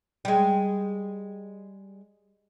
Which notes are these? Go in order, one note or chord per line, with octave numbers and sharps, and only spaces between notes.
G3 G#3